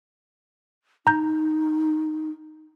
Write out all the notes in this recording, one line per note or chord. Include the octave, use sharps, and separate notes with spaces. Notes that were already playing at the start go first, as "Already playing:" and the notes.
D#4 A#5 G6